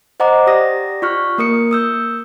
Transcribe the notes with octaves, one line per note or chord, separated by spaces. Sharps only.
C5 D#5 F#5 A#5 D6
G4 D5 D#6 A#6
F4 D5 C#6 F6 F#6
A#3 A#4 D#6 C#7
D#6 E6 G6